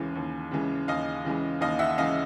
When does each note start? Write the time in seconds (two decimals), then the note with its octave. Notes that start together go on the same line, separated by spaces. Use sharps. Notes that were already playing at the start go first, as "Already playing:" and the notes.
Already playing: D#2 C#3 E3 G#3
0.15 D#2
0.51 C#3 E3 G#3
0.88 D#2 D#5 F5
1.25 C#3 E3 G#3
1.61 D#2 D#5 F5
1.79 E5 F#5
1.98 C#3 E3 G#3 D#5 F5